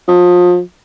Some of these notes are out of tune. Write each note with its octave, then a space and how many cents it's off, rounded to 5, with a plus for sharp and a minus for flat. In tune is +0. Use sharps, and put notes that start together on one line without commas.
F3 +30